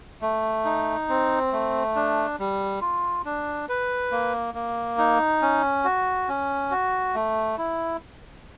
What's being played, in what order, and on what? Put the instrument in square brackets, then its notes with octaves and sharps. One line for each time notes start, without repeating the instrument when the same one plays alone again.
[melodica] A3
D#4
C4
A3
D4
G3
F4
D4
B4
A#3
A#3
D#4
C#4
F#4
C#4
F#4
A3
E4